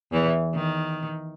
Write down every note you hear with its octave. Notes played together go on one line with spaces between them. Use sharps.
E2 E3
D#3